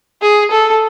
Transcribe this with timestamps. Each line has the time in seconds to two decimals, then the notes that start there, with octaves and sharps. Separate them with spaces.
0.22 G#4
0.51 A4